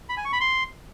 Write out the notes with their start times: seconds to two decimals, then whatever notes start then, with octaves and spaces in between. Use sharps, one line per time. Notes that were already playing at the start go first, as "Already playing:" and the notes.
0.09 B5
0.17 G#5
0.25 C#6
0.33 B5
0.41 C6